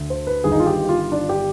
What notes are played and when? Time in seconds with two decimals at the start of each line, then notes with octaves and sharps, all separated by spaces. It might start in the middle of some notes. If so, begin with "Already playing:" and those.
Already playing: D2
0.10 C5
0.27 B4
0.44 G1 G2 D#3 G#4
0.51 D#4
0.60 F4
0.67 G4
0.89 F4
1.12 D4
1.29 G4